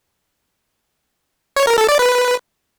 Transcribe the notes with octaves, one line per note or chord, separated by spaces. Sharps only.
C#5
A#4
A4
D5
B4